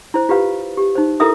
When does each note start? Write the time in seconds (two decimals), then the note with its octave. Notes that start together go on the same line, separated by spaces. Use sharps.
0.14 E4 C5
0.29 F4 G4 B4 F5
0.77 G4
0.95 D#4 C5
1.20 E4 A4 A#4 E5 D#6